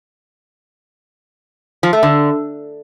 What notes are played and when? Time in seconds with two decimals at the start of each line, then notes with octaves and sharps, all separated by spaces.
1.83 F3
1.93 A3
2.03 D3